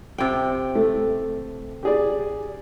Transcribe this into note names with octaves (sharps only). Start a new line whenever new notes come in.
C3 G5
A3
G4 G#4 D5